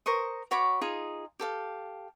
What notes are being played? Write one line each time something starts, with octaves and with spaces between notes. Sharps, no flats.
A#4 C5 C#6 D#6
F#4 C#5 B5 D6
D#4 F4 G#4
G4 A4 F5